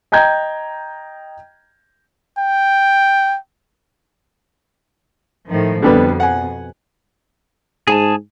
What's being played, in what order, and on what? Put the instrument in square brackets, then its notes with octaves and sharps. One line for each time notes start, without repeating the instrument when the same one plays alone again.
[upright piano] D#5 G5 A#5 G6 G#6
[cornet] G5
[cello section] A2 D#3 F3
[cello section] F2 B2 [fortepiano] D3 G3 B3
[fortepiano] F#5 G#5
[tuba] G#2 [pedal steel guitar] G#4 G#5 A5